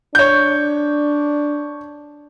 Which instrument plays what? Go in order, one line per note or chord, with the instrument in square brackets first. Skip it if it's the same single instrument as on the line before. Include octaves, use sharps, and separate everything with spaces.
[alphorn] D4 [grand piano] C#5 G6